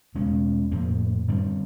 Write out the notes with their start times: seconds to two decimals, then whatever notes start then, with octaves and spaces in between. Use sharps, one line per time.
0.15 E2 B2 G#3 C#4
0.72 F2 A2 F3 A#3
1.28 F#2 D3 G3 C4